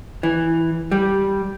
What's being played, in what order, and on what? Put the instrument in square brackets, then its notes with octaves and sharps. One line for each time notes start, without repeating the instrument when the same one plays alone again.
[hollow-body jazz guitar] E3
G3